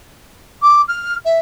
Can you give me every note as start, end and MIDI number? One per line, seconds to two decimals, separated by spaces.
0.62 0.81 86
0.88 1.15 89
1.25 1.39 76